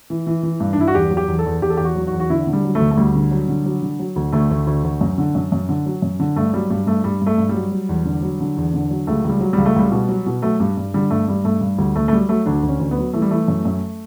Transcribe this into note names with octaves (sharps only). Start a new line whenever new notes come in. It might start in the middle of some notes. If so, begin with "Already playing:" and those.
E3
E3
E3
G2
D4
G2 E4
F#4
E2 G4
F#3
G4
E2
A4
E2
E2 G4
A4
E2 G4
F#4
F#3
F#4
E2
F#4
D3 E4
D3
G3
F#3
D2 A3
A3
D2 G3
D3
F#3
D3
F#3
D3
F#3
D2
D2 A3
D2
D2
D2
F#2
D3
F#2
F#2
D3
F#3
F#2
D3
G2 A3
F#3 G3
G2 G3
G2 A3
G2 G3
G2
A3
G2
G3
F#3
F#3
E2
D3
F#3
D3
E2
D3
F#3
C#2 A3
C#2
G3
F#3
G3
C#2
A3
C#2 G3
B2
F#3
B2
F#3 A3
G2 G3
G2 G3
D3 G3
G2 A3
G2 G3
G2 A3
G2
D2 G3
D2 A3
A3
F#3 G3
F#3 A3
D2 D4
D2
C#4
D2
B3
F#3
E3 A3
G3
E3 A3
F#2
F#2